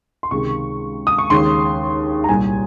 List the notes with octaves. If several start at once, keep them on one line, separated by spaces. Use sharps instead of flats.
C6
C#2 C3 D#3 G#3 C#6
D#6
C#6
D#2 C#3 G#3 C6
A#5
C2 A#2 G3 G#5